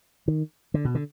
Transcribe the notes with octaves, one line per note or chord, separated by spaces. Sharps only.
D#3
D3
B2
D3